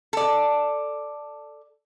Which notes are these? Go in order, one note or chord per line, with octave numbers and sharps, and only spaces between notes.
A4 D5